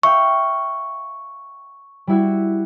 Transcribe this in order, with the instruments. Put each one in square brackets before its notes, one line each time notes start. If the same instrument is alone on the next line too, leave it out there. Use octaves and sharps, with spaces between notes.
[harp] E5 F5 G5 [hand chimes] C#6
[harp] G3 E4 F#4